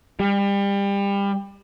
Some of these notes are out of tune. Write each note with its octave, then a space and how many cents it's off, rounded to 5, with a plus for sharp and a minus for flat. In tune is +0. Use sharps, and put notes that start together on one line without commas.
G3 +30